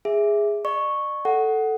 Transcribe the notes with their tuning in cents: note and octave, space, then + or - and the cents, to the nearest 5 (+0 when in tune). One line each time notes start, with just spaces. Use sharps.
G#4 -5 E5 +0
D5 +40 C#6 -5
A4 +0 F#5 +10